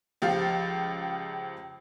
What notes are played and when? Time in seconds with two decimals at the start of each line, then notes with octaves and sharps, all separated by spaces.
0.22 C#2 F3 G4 F5 A6